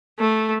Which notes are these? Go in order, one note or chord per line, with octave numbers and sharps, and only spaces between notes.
A3